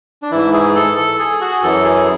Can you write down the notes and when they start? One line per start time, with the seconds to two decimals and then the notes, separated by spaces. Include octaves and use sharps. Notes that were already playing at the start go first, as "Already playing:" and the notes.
0.22 D4
0.31 G#2 E3 E4
0.53 G#4
0.75 A4
0.97 A4
1.19 G#4
1.41 F#4
1.52 G#4
1.62 F#2 E3 A4
1.84 G#4